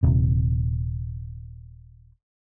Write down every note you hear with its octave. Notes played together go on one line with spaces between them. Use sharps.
D#1 C3